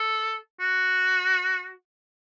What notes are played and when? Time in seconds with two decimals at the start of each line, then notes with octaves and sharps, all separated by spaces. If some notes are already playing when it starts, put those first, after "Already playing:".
Already playing: A4
0.61 F#4